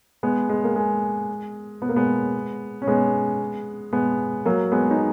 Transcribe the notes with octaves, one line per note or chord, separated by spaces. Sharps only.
G#3 B3
G#3
A#3
G#3
B3
A#3
G#3 B3
C#4
G#3 B3
G#3 B3
F#3 A#3
G#3 B3
D#4